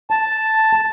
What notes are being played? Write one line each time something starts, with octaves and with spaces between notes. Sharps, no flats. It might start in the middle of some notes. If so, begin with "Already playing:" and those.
A5